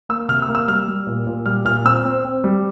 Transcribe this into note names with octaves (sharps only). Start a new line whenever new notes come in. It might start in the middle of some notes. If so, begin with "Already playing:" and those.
A#3 E6
C3 F6
E6
A#3
E6
G3 F6
G3
A#2
A#2
G3 F6
A#2 F6
C4 E6
C4
C4
G3